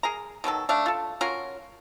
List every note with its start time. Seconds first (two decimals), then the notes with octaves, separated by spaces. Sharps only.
0.03 G#4 A#4 A#5
0.44 B2 D#3 F#3 A4
0.69 A3 D4 F5
0.86 F4 A4
1.21 C#4 F4 F#4 A#4